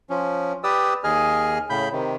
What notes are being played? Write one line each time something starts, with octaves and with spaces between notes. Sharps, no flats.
F3 C#4
G4 B4 D5 D#6 E6
D#2 G#4 D#5 G#5 F6
A2 C#3 B5 G6
C3 D#3